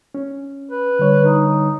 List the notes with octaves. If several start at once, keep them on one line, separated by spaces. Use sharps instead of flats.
C#4
B4
D3 G3 C#5
D#4